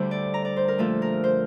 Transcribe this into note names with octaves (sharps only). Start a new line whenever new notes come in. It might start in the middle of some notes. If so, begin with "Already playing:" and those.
Already playing: D2 D3 G3 C5
D5
A#5
D5
C5
A#4
A#2 F3 A3 A4
A#4
C5